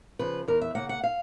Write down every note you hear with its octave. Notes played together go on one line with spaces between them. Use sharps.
C#3 F3 B4
E2 A#4
E5
C#3 F#3 A#3 F#5
F#5
F5